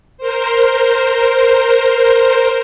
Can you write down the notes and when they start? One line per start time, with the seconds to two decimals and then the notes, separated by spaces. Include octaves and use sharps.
0.18 A#4 C5